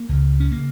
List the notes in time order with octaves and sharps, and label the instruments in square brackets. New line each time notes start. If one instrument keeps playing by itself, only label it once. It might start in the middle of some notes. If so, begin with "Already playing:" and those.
Already playing: [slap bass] A#3
C#2 C#3
C#4
C#3 A#3